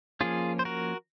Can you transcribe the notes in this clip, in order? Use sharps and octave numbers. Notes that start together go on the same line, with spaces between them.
F3 A#3 C#4 F4 G#4
C5
F#4 A#4